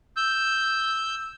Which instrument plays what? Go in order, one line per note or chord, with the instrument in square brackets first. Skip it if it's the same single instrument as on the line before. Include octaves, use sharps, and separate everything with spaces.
[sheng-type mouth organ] E6 G6